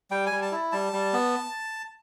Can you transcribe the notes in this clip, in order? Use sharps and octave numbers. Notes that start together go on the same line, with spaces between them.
G3 G5
G#5
G3
A5
E4
G3 A5
G3
B3